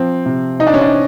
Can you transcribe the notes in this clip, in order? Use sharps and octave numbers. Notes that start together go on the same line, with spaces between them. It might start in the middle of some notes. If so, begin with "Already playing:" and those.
Already playing: F3 C4
C3
C3 D#4
D4
C#4
D4